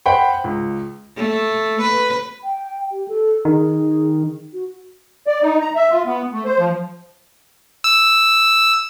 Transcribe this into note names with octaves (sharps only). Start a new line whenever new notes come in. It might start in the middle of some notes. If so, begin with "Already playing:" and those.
C5 F#5 G5 B5
C#2
A3
B4
G5
G4
A4
D#3 G#4
F#4
D5
D#4
A#5
E5
F4
B3
A3
C5
F3
E6